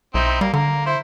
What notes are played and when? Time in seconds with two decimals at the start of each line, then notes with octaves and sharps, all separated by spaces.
0.14 B1 C4 D#4 E4
0.41 G3 A#3
0.53 D3 A#3 A#4
0.86 E4 C5